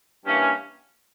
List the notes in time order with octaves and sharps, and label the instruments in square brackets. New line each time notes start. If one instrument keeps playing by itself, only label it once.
[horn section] G2 E3 A#3 C#4